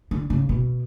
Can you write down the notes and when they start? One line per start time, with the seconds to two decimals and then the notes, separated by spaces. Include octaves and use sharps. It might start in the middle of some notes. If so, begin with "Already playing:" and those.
0.11 D3
0.30 C#3
0.49 B2